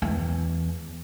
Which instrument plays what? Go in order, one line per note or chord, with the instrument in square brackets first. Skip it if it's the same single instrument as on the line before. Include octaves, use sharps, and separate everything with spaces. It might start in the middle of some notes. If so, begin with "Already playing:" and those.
[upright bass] E2